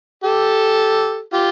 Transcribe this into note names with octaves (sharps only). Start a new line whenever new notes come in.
G4 A4
F4 G4